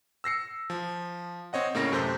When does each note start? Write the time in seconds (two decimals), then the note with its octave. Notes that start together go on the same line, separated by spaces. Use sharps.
0.24 E6 A#6 C7 C#7
0.70 F3
1.53 C4 C#5 D#5 F#5
1.75 A2 C#3 A#3 C#4 A#6
1.92 F#2 C3 A3 C5 G6